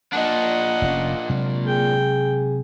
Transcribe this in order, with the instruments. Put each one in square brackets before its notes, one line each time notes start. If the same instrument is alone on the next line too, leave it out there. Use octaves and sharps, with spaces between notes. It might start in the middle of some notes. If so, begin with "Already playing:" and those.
[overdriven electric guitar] A#2 D4 [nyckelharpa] D#5 F#5
[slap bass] F1 C4 C#4
C3 F#3 G#3
[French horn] G#4 [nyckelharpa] G5